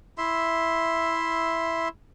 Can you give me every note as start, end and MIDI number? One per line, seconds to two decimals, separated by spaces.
0.18 1.88 64
0.18 1.88 76
0.18 1.88 84